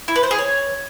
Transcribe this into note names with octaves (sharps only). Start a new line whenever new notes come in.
E4
B4
C5
G#4
C#5